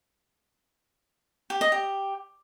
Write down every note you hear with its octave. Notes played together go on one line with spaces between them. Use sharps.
G4
D#5
G4